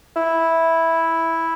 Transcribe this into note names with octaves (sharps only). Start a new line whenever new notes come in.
E4